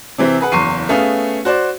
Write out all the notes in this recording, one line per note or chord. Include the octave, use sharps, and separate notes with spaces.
C3 E3 C4 E4
G#4 B4 F#5
F#1 E2 C6 C#6 C7 D#7
A3 B3 C#4 G#4 F5
F#4 C5 D5